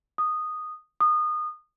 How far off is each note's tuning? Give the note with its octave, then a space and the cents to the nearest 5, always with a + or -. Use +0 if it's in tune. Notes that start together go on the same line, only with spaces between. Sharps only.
D#6 -10
D#6 -25